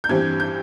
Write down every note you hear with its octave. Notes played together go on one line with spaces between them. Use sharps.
G6
G2 E3 G3 C4 G#6
G6